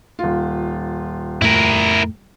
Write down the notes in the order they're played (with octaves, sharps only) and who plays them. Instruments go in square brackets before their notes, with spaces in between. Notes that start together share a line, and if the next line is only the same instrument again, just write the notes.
[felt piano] D#1 F4
[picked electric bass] F2 A2 A3 [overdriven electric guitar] E4 A#4